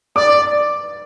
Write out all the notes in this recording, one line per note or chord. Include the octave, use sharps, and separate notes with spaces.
D5 D6